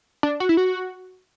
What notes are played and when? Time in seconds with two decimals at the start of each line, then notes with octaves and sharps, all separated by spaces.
0.23 D4
0.40 F#4
0.49 E4
0.57 F#4